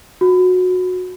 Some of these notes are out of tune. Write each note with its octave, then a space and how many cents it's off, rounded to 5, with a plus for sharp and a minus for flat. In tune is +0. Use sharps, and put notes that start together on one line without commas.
F#4 -20